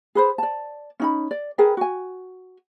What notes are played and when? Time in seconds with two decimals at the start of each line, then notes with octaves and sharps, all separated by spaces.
0.15 G#4 B4 C5
0.38 D5 A5
1.00 C#4 D#4 B5
1.31 D5
1.58 G#4 A#4 B4 G5
1.77 F#4 G#5